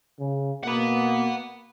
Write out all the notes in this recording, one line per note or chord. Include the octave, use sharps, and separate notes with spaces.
C#3
B2 A#3 F#5 B5